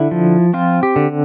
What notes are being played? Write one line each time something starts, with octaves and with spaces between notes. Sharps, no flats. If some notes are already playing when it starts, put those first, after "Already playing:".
Already playing: D3 E4
F3
C4 F4
G4
D3